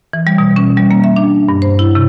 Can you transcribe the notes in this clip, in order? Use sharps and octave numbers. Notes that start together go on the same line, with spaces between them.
E3
G3
B2
C#4
G3
A#3
E5
D4
G2
C5
E4
C3